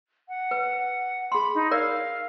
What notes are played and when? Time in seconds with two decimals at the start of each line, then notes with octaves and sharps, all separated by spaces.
0.28 F#5
0.51 B4
1.32 G#4 B5 C6
1.55 D#4
1.71 A#4 D5 F5